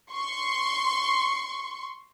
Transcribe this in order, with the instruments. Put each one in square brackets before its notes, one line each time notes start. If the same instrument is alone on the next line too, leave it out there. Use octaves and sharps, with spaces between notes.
[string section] C6 C#6